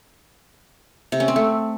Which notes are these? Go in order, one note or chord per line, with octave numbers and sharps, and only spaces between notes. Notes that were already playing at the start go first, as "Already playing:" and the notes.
C3
C#4
C4
A3